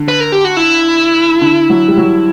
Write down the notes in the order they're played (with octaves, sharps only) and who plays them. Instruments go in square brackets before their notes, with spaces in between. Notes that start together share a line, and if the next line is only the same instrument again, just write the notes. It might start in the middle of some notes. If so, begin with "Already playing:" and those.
Already playing: [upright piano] D3
[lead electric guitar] B4
A#4
G4
F#4
E4
[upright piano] D3
F#3
G3
F#3